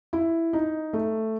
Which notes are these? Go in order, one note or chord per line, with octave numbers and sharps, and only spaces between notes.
E4
D#4
A3